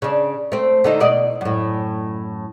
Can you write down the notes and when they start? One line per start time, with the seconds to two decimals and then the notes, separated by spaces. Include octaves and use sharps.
0.02 C#3 D4
0.52 A3 C4
0.84 D3 A3 D#4
1.00 B2 D5 D#5
1.41 F#2 A2